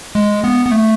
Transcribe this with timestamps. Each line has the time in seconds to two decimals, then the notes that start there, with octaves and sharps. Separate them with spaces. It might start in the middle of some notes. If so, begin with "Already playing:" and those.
0.15 G#3
0.44 B3
0.66 B3
0.71 A3